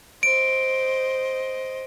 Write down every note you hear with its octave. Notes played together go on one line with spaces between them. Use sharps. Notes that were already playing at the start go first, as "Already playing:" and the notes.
C5 D#5 D7